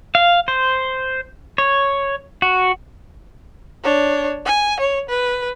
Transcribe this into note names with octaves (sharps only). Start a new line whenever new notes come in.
F5
C5
C#5
F#4
D4 C#5
G#5
C#5
B4